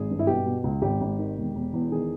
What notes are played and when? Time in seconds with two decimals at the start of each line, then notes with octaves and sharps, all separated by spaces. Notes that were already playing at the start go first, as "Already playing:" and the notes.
Already playing: G#1 G#4
0.10 G2
0.19 E4
0.27 B2 G4
0.46 B2
0.64 C#2
0.82 G#1 G4
1.01 G#1
1.19 D#3
1.38 E1
1.55 E1
1.73 E2
1.91 D#3 G#4